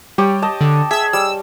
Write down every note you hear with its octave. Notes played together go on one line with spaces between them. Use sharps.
G3 G4 C#5
D#5 A5
D3
G#4 E5 E6
G3 E6